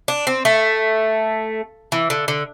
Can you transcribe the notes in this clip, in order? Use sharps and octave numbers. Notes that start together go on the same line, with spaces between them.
D4
C4
A3
E3
D3
D3